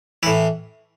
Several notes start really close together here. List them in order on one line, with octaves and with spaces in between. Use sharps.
E3 E4 A2